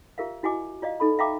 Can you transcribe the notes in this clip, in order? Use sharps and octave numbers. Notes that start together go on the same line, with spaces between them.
F4 G4 A#4 E5 F5
E4 F#4 D#5 G#5 D6
F4 D5 D#5 F5
D#4 A4 B5
E5 F5 G5 A#5 B5 D6